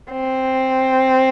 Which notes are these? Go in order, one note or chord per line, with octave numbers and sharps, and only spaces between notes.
C4